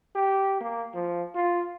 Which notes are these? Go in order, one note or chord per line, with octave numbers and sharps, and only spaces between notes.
G4
A#3
F3
F4